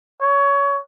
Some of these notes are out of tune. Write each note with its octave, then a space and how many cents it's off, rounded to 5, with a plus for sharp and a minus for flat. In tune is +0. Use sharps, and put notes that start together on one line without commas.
C#5 +20